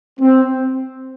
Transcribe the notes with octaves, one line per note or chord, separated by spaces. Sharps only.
C4